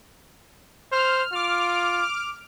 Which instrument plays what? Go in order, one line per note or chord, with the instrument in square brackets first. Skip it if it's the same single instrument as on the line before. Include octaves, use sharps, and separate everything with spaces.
[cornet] C5 [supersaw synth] F6
[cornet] F4 [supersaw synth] D6 F6